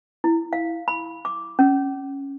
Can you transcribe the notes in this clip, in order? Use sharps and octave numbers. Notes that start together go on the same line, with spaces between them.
E4
F5
B5
D6
C#4